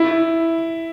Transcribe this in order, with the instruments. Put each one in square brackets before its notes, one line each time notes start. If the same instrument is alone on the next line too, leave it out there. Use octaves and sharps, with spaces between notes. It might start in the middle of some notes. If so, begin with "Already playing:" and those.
Already playing: [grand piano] E4